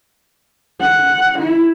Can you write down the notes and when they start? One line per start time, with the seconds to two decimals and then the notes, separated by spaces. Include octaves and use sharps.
0.81 F#5
1.38 E4